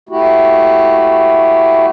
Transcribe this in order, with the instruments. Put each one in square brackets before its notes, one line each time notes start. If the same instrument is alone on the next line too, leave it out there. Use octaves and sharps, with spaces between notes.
[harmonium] A3 E4 F#4 G4